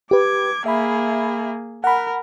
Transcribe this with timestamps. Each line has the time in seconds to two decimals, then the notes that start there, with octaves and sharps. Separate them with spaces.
0.11 G4 B4 D6 G#6
0.66 A#3 G#4 E5 B5
1.84 A#4 F#5 B5